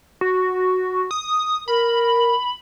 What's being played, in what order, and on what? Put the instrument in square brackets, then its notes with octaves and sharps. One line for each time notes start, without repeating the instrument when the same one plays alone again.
[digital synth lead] F#4
D#6
[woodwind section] A#4 [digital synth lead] B5